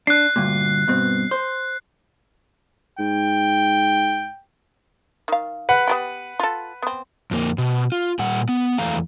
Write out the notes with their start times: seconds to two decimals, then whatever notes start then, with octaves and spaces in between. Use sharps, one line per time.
0.07 D4 F#6 C7
0.36 D2 G2 A#2
0.88 G2 B2 C4
1.31 C5
2.99 G#2 G5
5.28 D#3 F5
5.69 B4 F#5
5.88 B3 G4 G5
6.40 F4 A4
6.82 B3 C4
7.31 F2 A#3
7.58 B2
7.92 F4
8.19 A#2 G3 F#5
8.49 B3
8.78 E2 E3 A3 F5 A#5